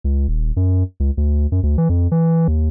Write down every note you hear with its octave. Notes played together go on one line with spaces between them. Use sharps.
C#2
D#1
F#2
C#2
D2
F#2
D2
E3
F2
E3
D#2